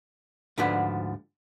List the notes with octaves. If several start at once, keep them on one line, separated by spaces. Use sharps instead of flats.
D2 G#2 D3 F3 B4 F#5